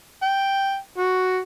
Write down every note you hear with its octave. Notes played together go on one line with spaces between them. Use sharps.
G5
F#4